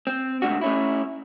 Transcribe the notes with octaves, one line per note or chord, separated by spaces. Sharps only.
C4
G#2 C3 A3 D4 F#4
A3 C#4 E4